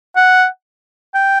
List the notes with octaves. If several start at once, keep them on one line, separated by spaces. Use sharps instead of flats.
F#5
G5